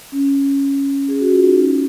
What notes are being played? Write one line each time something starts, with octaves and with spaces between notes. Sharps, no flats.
C#4
G#4
F#4
F4
D#4
C#4